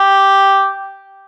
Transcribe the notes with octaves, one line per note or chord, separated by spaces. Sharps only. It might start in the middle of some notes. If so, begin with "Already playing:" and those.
Already playing: G4